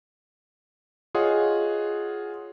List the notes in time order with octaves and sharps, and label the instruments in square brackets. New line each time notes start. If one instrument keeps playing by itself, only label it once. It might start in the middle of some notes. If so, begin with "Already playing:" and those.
[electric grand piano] F4 G#4 C#5 D#5 F#5